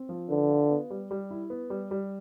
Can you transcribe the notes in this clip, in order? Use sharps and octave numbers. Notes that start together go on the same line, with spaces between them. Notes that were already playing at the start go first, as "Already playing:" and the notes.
Already playing: C4
F3
D3 B4
F4
B3
G3
G3
E4
B3
G3
G3